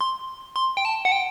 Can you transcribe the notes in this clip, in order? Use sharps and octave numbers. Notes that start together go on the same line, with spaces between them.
C6
C6
G5
A5
F#5
G5